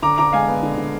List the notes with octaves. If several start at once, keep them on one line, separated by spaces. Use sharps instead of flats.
D3 A#5 D6
D3 A#5 D6
G#3 F5 G#5
B3
D3
D3